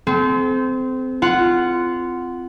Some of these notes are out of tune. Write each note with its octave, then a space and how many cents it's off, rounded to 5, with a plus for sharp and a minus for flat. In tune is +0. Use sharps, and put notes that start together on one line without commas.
C4 -20 A4 -45
F4 -15 F#5 +0